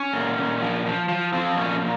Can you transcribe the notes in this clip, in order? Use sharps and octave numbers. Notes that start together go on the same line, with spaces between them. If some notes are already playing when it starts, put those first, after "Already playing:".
Already playing: C#4
A#2
A#2
F3
F3
F3
F3 C4
A#2 C#4
A#2